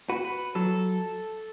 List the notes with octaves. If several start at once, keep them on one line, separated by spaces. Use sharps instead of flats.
F#4 B4
B4
F#3 A4